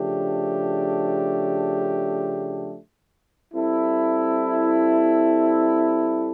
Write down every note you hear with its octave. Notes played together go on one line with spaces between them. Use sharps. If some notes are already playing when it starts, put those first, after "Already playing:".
Already playing: C#3 F3 A3 D4 G4
G3 C4 E4 A4